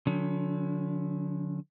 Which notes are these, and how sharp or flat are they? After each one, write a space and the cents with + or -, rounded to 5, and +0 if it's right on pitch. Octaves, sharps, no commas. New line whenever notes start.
D3 +0 F#3 -45 C#4 +35